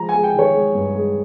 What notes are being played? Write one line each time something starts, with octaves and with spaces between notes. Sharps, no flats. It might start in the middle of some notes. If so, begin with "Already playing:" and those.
Already playing: F3 G#3 A#5
G#5
G#3
G5
D#3 C#5
G#3
G2
G#3